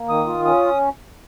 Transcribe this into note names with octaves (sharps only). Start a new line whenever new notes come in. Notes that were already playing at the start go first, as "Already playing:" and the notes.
Already playing: A#3
D#3 D#6
F4
C#4 D#6